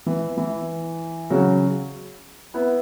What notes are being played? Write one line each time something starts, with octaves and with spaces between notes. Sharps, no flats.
E3
E3
C#3 F#3
B3 E4